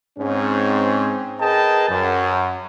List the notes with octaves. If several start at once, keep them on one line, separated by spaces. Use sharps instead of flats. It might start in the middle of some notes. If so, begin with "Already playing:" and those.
G#2 C4 C#4
G#4 A#4 B4 D#5 G5 A5
F#2